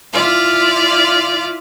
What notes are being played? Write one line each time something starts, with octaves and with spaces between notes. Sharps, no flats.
E4 F4 D5 F5